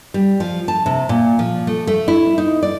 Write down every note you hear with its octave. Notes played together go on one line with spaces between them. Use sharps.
G3
F3
A5
C3
A#2
F3
A3
A3
E4
D#4
D5